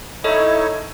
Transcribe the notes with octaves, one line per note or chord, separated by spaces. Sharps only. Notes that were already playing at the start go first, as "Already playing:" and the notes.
D#4 E4 A4 C#5 D#5